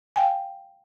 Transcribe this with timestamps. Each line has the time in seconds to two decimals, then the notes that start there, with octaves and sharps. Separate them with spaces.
0.16 F5 G5 G#5